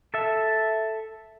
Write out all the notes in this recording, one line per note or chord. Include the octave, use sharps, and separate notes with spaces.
A4 E5